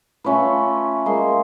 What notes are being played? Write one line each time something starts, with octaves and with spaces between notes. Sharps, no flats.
A3 C#4 F4 B4
G#3 A#3 C6